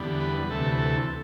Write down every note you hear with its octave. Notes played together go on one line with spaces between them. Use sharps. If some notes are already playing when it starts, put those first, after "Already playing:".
Already playing: E2 D3 G3 B3
B4
B4
D2 C3 E3 A3 A4
B4
A4